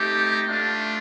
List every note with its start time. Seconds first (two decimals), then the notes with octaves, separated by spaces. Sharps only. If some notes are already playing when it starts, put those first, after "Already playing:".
Already playing: A3 C4 D#4 G4
0.46 A3 D4 F4